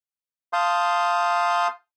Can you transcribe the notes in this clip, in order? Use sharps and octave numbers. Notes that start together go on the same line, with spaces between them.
F5 A5 C6 D#6 G6